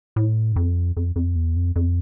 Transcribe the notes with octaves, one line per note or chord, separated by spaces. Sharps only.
A2
G#2
F2
F2
F2
E2
F2
F2